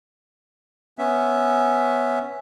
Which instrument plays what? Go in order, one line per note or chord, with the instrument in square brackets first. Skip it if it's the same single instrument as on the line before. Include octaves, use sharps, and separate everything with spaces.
[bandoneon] B3 C#4 E5